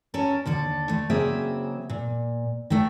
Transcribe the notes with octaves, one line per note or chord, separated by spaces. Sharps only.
C#4 A4 A#4
D#2 D3 A4
A3
C#3 F#3 A#3 C4 G#4 E5
A#2
D#3 A3